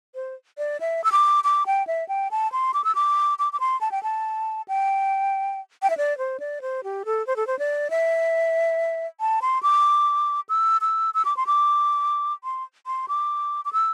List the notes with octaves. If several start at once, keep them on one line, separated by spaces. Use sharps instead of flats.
C5
D5
E5
E6
D6
D6
G5
E5
G5
A5
C6
D6
E6
D6
D6
D6
C6
A5
G5
A5
G5
G5
E5
D5
C5
D5
C5
G4
A4
C5
A4
C5
D5
E5
A5
C6
D6
E6
E6
E6
D6
C6
D6
C6
C6
D6
D6
E6